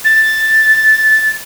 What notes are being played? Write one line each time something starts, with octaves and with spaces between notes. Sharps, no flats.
A6